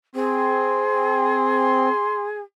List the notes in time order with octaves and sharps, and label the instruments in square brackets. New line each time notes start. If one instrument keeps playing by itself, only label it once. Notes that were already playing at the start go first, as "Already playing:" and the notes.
[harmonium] C4 [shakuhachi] G#4 [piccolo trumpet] C6